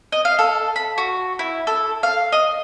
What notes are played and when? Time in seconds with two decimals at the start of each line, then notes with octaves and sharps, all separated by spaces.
0.12 D#5
0.25 F5
0.39 A4
0.76 B5
0.98 F#4
1.39 E4
1.67 A4
2.03 F5
2.32 D#5